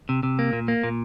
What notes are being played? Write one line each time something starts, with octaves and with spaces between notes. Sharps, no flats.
C3
C3
A#3
A#2
A#3
A#2